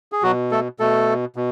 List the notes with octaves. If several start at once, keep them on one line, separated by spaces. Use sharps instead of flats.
G#4
B2 F#3 F#4
A3 A4
B2 A3 A4
B2